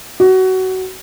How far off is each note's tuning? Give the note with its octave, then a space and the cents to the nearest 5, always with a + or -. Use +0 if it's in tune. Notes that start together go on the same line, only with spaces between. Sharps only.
F#4 +20